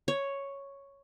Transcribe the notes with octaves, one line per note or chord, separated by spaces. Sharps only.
C#5